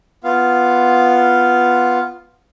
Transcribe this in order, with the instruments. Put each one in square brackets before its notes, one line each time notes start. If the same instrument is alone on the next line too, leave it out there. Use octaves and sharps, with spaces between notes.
[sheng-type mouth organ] B3 F4 F5